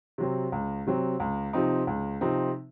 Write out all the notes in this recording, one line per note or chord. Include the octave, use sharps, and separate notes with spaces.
C3 F#3 C4
C#2
C3 F#3 C4
C#2
C3 F3 C4 D#4
C#2
C3 F3 C4 D#4